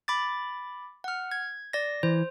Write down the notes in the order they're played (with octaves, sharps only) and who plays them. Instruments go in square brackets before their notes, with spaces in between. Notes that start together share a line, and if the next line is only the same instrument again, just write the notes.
[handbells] B5 D6 A6
F#5 F6
G#6
D5 A#6
[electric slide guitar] E3 [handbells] C5